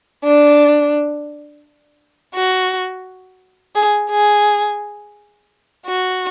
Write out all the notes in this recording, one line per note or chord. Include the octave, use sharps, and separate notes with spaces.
D4
F#4
G#4
G#4
F#4